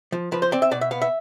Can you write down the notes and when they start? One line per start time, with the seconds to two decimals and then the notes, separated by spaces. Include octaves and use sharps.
0.12 F3
0.32 F3 B4
0.42 C5
0.52 C4 D5
0.62 E5
0.71 B2 D5
0.81 E5
0.91 B3 F5
1.02 E5